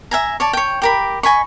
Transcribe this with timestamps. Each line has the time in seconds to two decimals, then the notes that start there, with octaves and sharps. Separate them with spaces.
0.11 E5 G#5 A#5
0.40 C#5 D5 A5
0.53 C#5 G5
0.82 G4 A#4 B5
1.23 D#5 G#5 B5 C#6